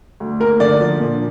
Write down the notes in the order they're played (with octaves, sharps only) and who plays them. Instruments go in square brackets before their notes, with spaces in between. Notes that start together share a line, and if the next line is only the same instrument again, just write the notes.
[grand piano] D2
[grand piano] A#3 [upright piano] A#4
[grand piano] D3 [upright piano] D5
[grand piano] F3
A#2